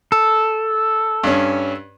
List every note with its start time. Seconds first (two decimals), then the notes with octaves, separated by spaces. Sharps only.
0.12 A4
1.24 G2 C#4